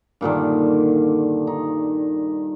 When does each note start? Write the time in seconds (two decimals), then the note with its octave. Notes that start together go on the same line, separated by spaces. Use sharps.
0.21 G2 A#2 D3 D#3
1.47 D#4